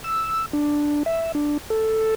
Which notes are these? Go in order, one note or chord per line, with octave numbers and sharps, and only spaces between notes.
E6
D4
E5
D4
A4